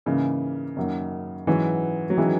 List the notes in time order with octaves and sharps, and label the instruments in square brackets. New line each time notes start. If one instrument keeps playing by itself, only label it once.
[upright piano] G#2 E3 A#3 [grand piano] C#3
[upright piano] F#2 D#3 F#3 A#3
[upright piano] G#2 F#3 C#4 F#4 B4 [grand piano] E3
[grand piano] F#3
[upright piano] D#3 G#3 C#4 E4 B4 [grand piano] E3